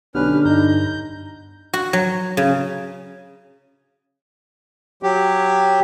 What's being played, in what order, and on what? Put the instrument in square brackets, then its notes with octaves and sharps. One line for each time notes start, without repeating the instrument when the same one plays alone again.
[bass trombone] B1 [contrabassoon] D3 [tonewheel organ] B3 G4 [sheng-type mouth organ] C#4 B4 F6
[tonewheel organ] G2 A#5 [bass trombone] D#4 [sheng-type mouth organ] G6
[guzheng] F#4
F#3
C#3
[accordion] F#3 G4